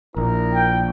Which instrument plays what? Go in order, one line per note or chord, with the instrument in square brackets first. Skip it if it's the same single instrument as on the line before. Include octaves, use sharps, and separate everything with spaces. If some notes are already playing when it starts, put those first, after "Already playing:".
[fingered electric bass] A#1 [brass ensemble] E4 A#4
[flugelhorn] G5